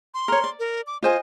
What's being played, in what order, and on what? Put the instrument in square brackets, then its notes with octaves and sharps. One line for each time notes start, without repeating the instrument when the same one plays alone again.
[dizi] C6
[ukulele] A#4 C#5
D5
[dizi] A#4
D6
[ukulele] F4 C5 G#5 [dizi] D#5